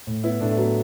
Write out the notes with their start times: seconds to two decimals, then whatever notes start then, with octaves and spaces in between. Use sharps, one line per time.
0.07 A2
0.24 B3 E4
0.40 A2 A3 D4
0.51 A3
0.57 F#3 B3